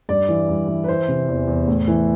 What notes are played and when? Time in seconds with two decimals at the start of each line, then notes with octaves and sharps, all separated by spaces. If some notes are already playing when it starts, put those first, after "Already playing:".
0.09 G2 D5
0.29 E3
0.49 G2
0.68 E3
0.84 B4
0.88 E3 C5
1.08 C3
1.28 E2
1.47 E2
1.68 A2
1.88 E3